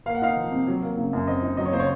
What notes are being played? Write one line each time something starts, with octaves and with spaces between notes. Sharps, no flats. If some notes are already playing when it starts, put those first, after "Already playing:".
A#3 F5
F#5
D#4 F5
F3
C3
F#3
A#3
C#3
F#2
C4 D#5
D#4
F#3 D#5
C#5
C#3 C5
C#5